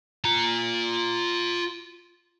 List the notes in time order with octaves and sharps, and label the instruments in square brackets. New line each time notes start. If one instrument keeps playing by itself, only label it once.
[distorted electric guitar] F4 A#5